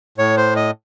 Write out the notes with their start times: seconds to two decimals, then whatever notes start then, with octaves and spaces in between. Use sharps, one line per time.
0.18 A2 C#5
0.37 C5
0.56 D#5